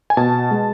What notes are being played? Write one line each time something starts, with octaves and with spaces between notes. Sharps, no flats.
G#5
B2 A5
G#3